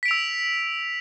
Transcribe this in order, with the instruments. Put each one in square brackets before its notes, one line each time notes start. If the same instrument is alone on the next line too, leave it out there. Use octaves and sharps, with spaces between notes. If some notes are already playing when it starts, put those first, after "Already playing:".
[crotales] B6
D7
F7
E6